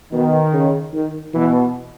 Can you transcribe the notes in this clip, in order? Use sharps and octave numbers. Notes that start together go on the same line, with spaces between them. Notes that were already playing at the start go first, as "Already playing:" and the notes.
B2 D#3
C#3
D#3
B2 E3